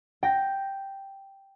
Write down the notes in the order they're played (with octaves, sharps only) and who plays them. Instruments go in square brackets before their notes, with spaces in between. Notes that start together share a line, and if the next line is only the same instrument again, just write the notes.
[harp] G5 A#6